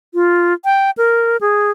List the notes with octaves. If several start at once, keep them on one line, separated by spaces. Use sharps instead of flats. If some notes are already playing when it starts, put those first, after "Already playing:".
F4
G5
A#4
G#4